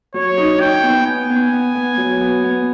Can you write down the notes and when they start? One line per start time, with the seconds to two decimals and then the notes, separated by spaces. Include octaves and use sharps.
0.14 F#3 C#5
0.38 D#4
0.60 D#4 G5
0.83 B3
1.06 B3 G#5
1.29 B3
1.53 B3
1.75 B3
1.98 F#3
2.21 B3
2.44 B3